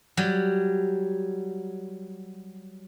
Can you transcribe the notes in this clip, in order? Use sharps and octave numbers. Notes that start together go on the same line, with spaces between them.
F#3 G3